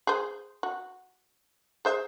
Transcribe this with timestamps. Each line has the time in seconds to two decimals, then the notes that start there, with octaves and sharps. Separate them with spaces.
0.07 G#4 C5
0.63 F#4
1.85 G#4 C5 E5